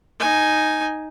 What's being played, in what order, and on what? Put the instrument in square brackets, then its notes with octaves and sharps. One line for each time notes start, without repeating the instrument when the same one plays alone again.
[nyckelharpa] D#4 G#5